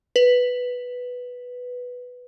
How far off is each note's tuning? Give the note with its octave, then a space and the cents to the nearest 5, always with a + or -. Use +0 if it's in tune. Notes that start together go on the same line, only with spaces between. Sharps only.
B4 +0